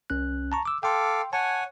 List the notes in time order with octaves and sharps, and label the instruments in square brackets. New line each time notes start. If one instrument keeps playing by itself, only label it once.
[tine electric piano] C2 C#4 F#6
A5 A#5 C#6
D6 E6
[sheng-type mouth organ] A4 F5 D6 [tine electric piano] G5 C6
[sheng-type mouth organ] C#5 F#5 G#5 [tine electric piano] A5